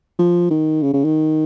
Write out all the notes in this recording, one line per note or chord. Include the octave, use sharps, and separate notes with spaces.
F3
D#3
C#3
C#3
D#3